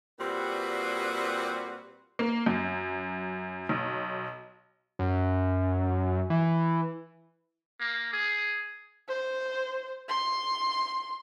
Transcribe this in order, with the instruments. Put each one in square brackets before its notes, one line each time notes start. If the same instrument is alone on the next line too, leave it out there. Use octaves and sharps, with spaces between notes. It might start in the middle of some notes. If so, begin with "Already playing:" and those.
[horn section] A#2 G3 C4 F#4 B4
[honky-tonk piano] A#3
F#2
B1
[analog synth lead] F#2
E3
[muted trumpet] A#3
G#4
[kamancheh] C5
C6